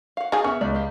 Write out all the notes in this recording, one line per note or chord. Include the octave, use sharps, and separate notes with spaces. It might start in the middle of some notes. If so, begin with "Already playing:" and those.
F5 F#5
D#4 G4 G#4 F5 G#5
B3 C#4 G#4 E5 C#6
C#2 D5
G4 F5